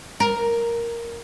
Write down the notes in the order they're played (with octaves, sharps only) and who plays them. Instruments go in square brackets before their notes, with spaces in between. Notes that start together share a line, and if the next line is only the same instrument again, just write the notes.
[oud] A#4